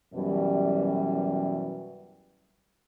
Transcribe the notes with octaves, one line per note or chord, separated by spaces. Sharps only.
F#2 B2 E3 F#3 G3